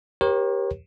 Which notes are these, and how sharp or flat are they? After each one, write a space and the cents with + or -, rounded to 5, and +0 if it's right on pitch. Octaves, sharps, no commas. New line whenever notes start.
G4 +0 A#4 +30 C#5 -40